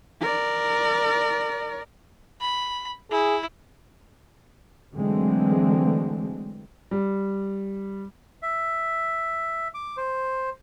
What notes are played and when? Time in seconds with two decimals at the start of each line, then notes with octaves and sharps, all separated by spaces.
0.21 A#4 D5
2.41 B5
3.11 E4 G#4
4.94 D3 E3 F#3 G#3 A3 C4
6.91 G3
8.42 E5
9.74 D6
9.97 C5